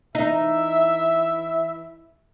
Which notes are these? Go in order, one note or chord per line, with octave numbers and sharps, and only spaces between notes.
E3 D#4 E4 E5